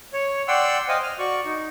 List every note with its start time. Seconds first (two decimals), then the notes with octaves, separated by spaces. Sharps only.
0.13 C#5
0.48 D5 F#5 G5 C6 E6
0.88 C5 D#5 F5 G5 G#5
1.03 F6
1.19 F#4 D5 C#6
1.45 D#4